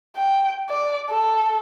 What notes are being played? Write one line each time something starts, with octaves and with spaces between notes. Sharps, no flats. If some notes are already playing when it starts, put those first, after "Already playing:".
G5
D5
A4